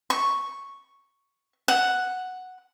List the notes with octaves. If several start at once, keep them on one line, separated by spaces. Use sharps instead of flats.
C#6
F#5